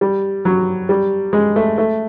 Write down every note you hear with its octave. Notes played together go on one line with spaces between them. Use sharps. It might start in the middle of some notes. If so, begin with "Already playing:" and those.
G3
F#3
G3
G#3
A3
A3